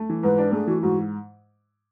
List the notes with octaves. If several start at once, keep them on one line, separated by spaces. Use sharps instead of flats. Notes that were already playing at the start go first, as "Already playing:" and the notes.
Already playing: A3
E3
G#2 B4
D4
A3 G#4
E3 F#4
G#2 F#4